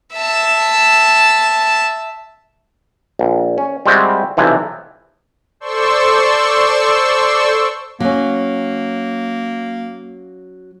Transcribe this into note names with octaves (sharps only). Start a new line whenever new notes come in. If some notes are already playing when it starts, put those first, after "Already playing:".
E5 A5
A#1
C#4
G3 G#3 C4 F#4 E5
B1 C3 E3 F3
A4 C5 D5 C6 C#6 E6
F#3 A#3 C#4